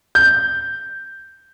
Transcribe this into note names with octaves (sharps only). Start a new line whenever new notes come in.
G6